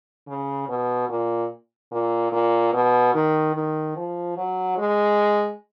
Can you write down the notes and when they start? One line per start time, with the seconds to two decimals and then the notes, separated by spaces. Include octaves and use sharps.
0.28 C#3
0.68 B2
1.09 A#2
1.92 A#2
2.32 A#2
2.73 B2
3.14 D#3
3.55 D#3
3.96 F3
4.37 F#3
4.78 G#3